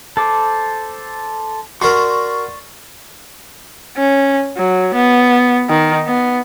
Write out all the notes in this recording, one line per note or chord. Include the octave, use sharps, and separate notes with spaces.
A4 C5 D6
F#4 A#4 D5 C6 C#6
C#4
F#3
B3
D#3
B3